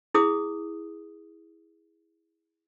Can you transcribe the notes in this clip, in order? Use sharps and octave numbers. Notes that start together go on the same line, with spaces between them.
E4 G#4 D#6